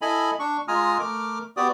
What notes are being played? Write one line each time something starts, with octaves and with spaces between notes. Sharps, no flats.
E4 A4 D#5 G#5 B5
D4 C#6
G#3 F4 G#5 A#5 D#6 F6
A3 A#4 D6 F6
B3 F#4 G4 D5 D6 D#6